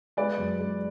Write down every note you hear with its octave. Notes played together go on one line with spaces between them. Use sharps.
G#3 B4 D5
F#2
G#3